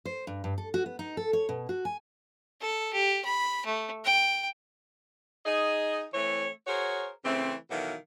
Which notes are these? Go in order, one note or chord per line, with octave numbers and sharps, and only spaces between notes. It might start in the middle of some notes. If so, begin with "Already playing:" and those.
C5
G2
G2
A4
F#4
B3
D#4
A4
C#5
B2
F#4
G#5
A4
G4
B5
A3
G5
D#4 G#4 D#5
E3 A3 C4 C#5
F#4 G#4 A#4 C5 C#5
C#3 E3 A3 C4
B2 D#3 E3 F#3 A4 F5